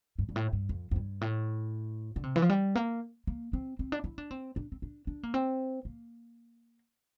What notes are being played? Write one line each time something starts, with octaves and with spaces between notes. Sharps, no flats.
G2
G2
A2
G2
F2
F2
G2
A2
D3
C3
E3
F3
G3
A#3
A#3
C4
C4
D4
E4
D4
C4
D4
C4
D4
D4
A#3
C4
A#3